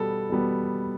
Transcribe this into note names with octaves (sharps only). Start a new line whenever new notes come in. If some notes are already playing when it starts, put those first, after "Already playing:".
Already playing: B2 G3 B3 A4
B2 G3 B3